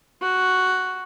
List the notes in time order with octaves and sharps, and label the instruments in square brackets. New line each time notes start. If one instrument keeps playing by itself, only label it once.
[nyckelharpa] F#4